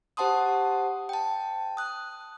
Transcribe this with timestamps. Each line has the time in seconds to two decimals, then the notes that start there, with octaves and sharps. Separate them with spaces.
0.17 G4 C5 F#5 A5 C6 D#6
1.09 G5 A5
1.77 D#6 F#6